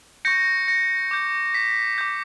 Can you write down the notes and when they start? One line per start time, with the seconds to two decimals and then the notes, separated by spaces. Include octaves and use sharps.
0.25 C#6 G6 A#6 C#7
0.67 A#6 C#7
1.11 D6 G6
1.54 B6
1.98 D6 G6